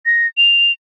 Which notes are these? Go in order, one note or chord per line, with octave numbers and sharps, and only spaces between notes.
A#6
F7